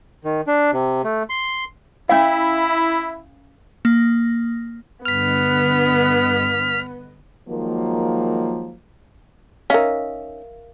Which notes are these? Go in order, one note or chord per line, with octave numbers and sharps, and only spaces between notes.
D#3
D4
C3
A3
C6
C#4 E4 F5
A#3
G2 D3 B3 D#5 F6 B6
D#3 F3 F#3 G#3 A#3
C#4 D#4 A#4 E5 F5